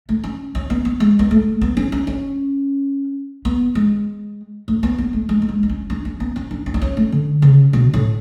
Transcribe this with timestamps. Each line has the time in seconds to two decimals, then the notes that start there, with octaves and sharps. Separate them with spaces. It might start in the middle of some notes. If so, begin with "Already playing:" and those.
0.09 A3
0.24 C#4
0.55 C#4
0.70 B3
0.85 B3
1.00 G#3
1.19 B3
1.31 A3
1.61 B3
1.77 C#4
1.92 D4
2.07 C#4
3.45 B3
3.75 G#3
4.68 A3
4.83 B3
4.98 B3
5.13 A3
5.29 G#3
5.42 A3
5.49 G#3
5.63 D4
5.69 C#4
5.90 D4
6.05 C#4
6.20 B3
6.36 C#4
6.51 D4
6.66 C#4
6.74 D4
6.82 C#4
6.97 A3
7.12 D3
7.42 C#3
7.73 B2
7.94 A2